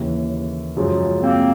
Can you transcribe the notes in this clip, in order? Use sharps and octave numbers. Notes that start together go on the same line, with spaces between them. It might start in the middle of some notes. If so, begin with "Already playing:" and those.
Already playing: D#2 C#3 E3
F#2 C#3 F3 G#3
A#3 C4